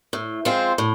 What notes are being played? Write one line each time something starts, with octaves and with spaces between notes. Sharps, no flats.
A2
F3 G#3 C4 F4
A2